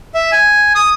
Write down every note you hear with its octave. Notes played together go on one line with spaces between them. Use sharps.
E5
G#5
D#6